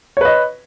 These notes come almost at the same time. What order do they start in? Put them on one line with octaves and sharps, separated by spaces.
C#5 B4 D#5